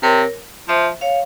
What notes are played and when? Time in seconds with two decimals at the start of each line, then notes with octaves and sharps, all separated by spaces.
0.03 C3 A#4 C#5
0.68 F3 C5 E5
1.01 C#5 F5